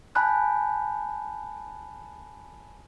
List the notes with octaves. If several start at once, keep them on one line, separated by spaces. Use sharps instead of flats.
G#5 A5 B5 F#6 G6